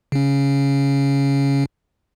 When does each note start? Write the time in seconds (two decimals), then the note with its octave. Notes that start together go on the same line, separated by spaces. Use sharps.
0.12 C#3 C#4